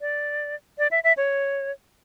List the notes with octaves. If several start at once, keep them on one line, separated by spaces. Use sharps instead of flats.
D5
D5
E5
E5
C#5